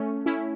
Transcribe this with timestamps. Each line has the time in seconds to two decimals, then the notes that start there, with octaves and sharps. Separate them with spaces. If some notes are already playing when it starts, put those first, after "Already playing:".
Already playing: A3 C#4
0.26 C#4 E4